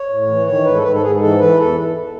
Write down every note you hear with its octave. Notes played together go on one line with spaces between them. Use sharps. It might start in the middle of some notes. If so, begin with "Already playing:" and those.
Already playing: C#5
A2
E3
D#3 C#5
G#2 B4
A4
G#2 B4
A4
G#2 G#4
E3 A4
E3 B4
E2 A4